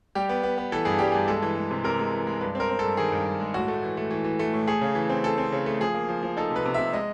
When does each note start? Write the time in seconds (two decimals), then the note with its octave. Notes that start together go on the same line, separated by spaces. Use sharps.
0.15 G3 G4
0.29 B3
0.43 B3
0.58 B3
0.72 E3 A4
0.85 G2 G#4
0.99 G3 G4
1.12 G2 G#4
1.28 G#3 A4
1.42 E3
1.57 G#3
1.71 C3
1.84 C3 A#4
1.99 G#3
2.13 E3
2.27 G#3
2.41 G2 B4
2.55 C4 A#4
2.69 C4
2.79 A4
2.84 G2
2.97 D#3 G#4
3.12 G2
3.27 G2
3.40 G#3
3.54 A2 F#4
3.68 A3
3.83 E3
3.97 A3
4.11 E3
4.25 E3
4.39 A3
4.53 A2
4.68 A3 G#4
4.82 C#3
4.95 E3
5.10 C4
5.24 E3 A4
5.38 C4
5.52 C#3
5.66 A3
5.81 F3 G#4
5.95 A#3
6.09 F3
6.23 F3
6.37 D#4 A4
6.51 C3 B4
6.65 C3
6.74 E5
6.79 C3
6.93 G#3 D#5